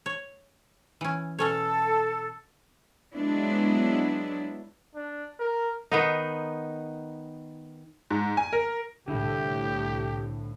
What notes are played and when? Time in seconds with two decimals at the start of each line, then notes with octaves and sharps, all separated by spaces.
0.06 C#5
1.01 E3 C#4
1.39 B2 C#4 A4 C#5
3.14 F#3 G#3 B3 D4 E4
4.95 D4
5.40 A#4
5.91 D#3 B3 D#4
8.10 G#2
8.37 G#5
8.53 A#4
9.08 C2 A2 D3 E4 G4